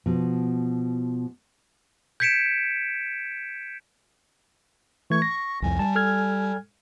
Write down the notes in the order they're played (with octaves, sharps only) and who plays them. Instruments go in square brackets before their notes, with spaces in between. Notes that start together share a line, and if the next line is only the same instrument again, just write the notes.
[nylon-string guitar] B2 F3
[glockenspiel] G6 G#6 B6 C#7 D7 E7
[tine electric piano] E3 A3 G#6 [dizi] C#6
[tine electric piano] A#6
[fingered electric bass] C2 F2 [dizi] G#5
[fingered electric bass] G3 [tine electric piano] A5
[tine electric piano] A4 F6 G#6